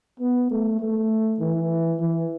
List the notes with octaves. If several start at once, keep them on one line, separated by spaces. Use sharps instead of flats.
B3
A3
A3
E3
E3